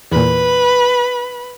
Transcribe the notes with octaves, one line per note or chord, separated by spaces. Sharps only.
E2 A#2 B4 B5